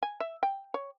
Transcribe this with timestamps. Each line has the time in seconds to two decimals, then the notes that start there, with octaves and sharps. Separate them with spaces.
0.03 G#5
0.20 E5
0.43 G5
0.74 C#5